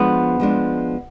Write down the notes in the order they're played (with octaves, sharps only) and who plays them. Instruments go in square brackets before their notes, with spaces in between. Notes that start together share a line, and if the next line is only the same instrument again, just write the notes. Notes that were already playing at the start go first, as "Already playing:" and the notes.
Already playing: [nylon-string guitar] F3 G#3 D4 [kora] B3
[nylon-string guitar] F3 G#3 D4